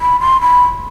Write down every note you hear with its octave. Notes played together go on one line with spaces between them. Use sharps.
B5
C6
B5